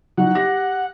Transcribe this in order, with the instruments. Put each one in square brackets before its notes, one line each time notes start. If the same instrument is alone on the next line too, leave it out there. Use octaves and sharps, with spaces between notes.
[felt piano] F#3 D#4 [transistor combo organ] F#5
[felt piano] G4 A#6